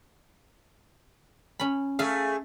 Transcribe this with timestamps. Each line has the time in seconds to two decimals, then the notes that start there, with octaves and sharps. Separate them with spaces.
1.60 C#4 B5
1.99 A3 G#4 E5 F5